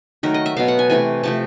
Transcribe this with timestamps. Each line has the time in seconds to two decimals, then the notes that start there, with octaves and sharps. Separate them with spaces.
0.23 D#3 F#3 A3 A#4
0.34 D#5
0.46 E5
0.57 B2 F#3 B3 F5
0.68 F#5
0.79 G#5
0.89 C3 E3 A3 G#5
1.23 C3 F3 A3 A5